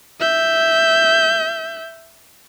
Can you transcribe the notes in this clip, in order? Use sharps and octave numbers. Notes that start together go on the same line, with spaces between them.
E5 G6